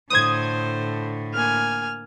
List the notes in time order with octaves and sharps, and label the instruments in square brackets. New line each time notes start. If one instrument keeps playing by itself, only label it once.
[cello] A2 D3 [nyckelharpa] C5 [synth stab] D#6 G#6
[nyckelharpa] A#3 G#5 [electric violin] F6